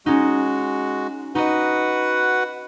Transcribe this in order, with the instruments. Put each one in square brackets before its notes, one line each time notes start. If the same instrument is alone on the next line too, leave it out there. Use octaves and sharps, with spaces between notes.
[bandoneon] G#3 F#4 [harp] C#4 D#4
[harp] D#4 D#5 [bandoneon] F#4 B4 F#5